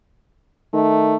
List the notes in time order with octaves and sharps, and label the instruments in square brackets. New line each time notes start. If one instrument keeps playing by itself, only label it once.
[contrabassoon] D#3 [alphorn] A3